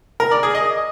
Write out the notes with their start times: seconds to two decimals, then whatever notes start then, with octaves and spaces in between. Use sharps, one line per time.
0.20 A#4
0.31 D5
0.43 G#4
0.55 D#5